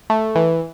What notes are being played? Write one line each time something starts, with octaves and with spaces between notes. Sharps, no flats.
A3
E3